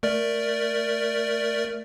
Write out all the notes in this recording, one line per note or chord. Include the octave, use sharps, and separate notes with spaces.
A3 A#4 D5